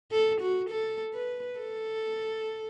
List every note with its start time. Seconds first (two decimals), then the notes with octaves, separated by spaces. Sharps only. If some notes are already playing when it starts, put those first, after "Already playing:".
0.11 A4
0.41 F#4
0.70 A4
1.14 B4
1.59 A4